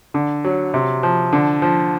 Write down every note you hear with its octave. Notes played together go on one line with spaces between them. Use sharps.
D3
F#3
C3
F3
D3
F3